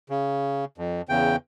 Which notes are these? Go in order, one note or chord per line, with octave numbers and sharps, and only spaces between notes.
C#3
F2
E2 C#3 G5